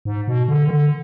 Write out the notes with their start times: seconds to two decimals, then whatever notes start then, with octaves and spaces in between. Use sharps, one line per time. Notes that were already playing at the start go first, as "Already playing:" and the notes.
0.05 G#2
0.28 B2
0.48 D3
0.67 D#3
0.70 D3